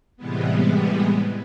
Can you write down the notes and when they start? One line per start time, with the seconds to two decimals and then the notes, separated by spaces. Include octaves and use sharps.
0.17 A2 C3 E3 G3 G#3 B3